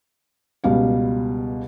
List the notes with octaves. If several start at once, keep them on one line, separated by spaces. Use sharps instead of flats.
C#2 B2 G3 F5